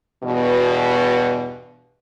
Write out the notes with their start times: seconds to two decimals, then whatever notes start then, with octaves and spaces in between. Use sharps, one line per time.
0.24 E2 G2 B2